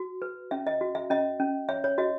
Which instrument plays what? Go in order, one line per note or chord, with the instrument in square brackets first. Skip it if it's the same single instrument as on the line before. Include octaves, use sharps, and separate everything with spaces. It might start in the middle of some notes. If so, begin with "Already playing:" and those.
Already playing: [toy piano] F#4
B4
C#4 E5
D#5
F#4
E5
C#4 D#5
C#4
C#5 E5
C#5
F#4 D#5